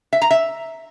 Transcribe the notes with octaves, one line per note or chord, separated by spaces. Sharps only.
E5
A#5
E5